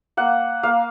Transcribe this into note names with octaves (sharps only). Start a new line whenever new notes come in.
A#3 F#5
A#3 F5